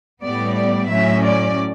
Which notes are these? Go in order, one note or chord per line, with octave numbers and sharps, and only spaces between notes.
A2 G3 B3 D5
D5
A2 F#3 C#4 E5
D5